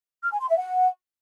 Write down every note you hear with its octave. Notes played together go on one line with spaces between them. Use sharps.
F6
G#5
C6
E5
F#5